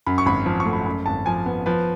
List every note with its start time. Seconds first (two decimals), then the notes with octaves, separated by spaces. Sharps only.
0.06 F#2 B5
0.18 C#6
0.26 G#1 B5
0.46 F3
0.60 C#6
0.66 A3
0.73 B5
0.86 F#2 B5
1.06 G#1 A5
1.26 F3 G#5
1.46 B3
1.66 F3 B4